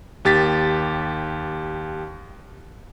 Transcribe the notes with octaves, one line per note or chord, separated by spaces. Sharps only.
D#2 G4 A6 B6